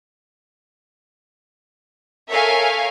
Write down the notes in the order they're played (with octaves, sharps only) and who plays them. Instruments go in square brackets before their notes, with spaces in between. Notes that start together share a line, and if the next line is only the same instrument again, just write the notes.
[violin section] A4 A#4 C#5 E5 F5 G#5